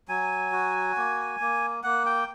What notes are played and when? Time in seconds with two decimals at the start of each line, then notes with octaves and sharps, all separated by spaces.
0.08 F#3 G#5
0.52 F#4
0.97 A#3
1.40 A#3
1.83 A#3 F#5
2.06 G5